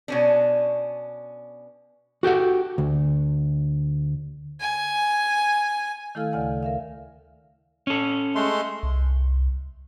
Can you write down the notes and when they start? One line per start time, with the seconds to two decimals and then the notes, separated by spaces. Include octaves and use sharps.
0.08 B2 C#4 D4
2.23 F#4 G4 A4 F#5
2.78 D2
4.61 G#5
6.15 D#3 A3 E4 A4 F5 F6
6.33 D2 C#3 D5 F5 F#5 G#5
6.63 A#4 E5 F5
7.87 C#4 A4
8.35 G#3 A3 C6
8.83 C2